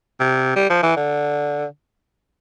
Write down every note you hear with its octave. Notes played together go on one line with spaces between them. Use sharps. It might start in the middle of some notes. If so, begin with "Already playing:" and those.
C3
G3
F3
E3
D3